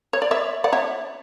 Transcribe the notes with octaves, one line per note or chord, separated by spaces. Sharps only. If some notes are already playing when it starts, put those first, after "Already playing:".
C#5
D5
C#5 E5
D5 F#5
C#5 E5